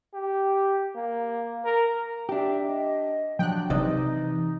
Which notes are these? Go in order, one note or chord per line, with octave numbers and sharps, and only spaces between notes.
G4
A#3
A#4
D4 G4 E5
D#5
F3 F#3 D4 G5 F#6
C3 E3 D#4 D5 D#5